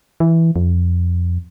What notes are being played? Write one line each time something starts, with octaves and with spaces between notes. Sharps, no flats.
E3
F2